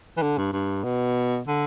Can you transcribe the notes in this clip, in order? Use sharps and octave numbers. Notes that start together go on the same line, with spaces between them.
E3
D3
G2
G2
B2
D3